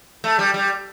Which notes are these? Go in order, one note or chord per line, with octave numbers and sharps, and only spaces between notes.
A3
G3
G3